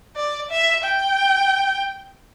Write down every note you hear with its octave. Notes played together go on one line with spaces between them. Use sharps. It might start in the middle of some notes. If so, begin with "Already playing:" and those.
D5
E5
G5